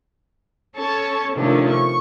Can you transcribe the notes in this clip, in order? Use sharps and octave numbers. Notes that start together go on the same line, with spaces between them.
C#4 A4 C#5 A5 C#6
C3 D#3 F3 A3 C#4 D4
C#6